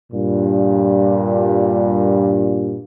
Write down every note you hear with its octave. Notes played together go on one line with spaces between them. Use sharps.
G2 A#2